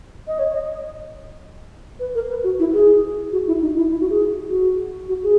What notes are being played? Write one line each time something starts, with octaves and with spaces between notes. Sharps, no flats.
D#5
C#5
D#5
B4
A#4
B4
F#4
E4
G#4
F#4
E4
D#4
E4
E4
F#4
G#4
F#4
F#4
G#4